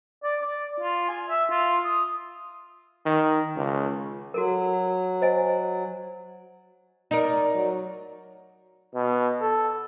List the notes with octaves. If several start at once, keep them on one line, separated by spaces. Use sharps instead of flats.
D5
D5
F4
G#5
E5
F4
D#6
D#3
C#2
F#3 F#4 A4 A#4
C5 D#5 G#5
D#4 A#4 D5
F#3
B2
A4